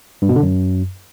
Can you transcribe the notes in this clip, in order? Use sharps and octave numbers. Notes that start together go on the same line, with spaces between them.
G2
B2
D3
F#2